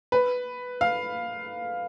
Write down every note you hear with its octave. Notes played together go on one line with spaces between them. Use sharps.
B4
F5